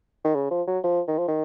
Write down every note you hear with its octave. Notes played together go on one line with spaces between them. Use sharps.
D#3
C#3
F3
F#3
F3
D#3
F3
D#3